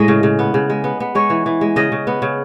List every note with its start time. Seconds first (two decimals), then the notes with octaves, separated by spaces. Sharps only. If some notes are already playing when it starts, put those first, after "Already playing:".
Already playing: A2 G#3 D#5
0.08 C#3
0.23 C#3
0.39 B3
0.54 C#3
0.70 G#3
0.84 B3
1.00 B3
1.15 G#3 C#5
1.30 E3
1.46 E3
1.61 G#3
1.76 C#3 D#5
1.92 C#3
2.07 B3
2.22 C#3